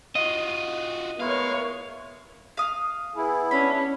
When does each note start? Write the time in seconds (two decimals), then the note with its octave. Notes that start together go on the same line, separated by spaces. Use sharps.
0.15 F4 F#4 D#5
1.20 G#3 A3 B3 E4 A#4 C#5 F5
2.57 F5 D#6
3.16 B3 E4 G#4
3.51 C#4 D4 B5